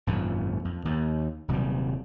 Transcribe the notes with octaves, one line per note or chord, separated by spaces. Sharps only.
G#1 F#2 A#2
F2
D#2
D#1 C3 F#3 G3